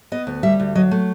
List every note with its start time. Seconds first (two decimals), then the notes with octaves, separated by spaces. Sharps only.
0.12 B3 D#5
0.27 D2
0.43 G3 E5
0.60 D2
0.75 F#3 D#5
0.91 A3